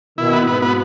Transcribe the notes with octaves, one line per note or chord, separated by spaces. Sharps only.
B2 D#3 E4
B3
G#2 B2 B3
B3